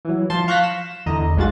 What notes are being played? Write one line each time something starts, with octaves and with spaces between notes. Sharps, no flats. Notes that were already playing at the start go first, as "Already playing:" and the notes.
E3 F#3
F3 A5 C6
F5 C#6 F#6 G6 A#6 B6
E7
E2 D3 D#5 A#5
B1 G#3 F4 F#4 A6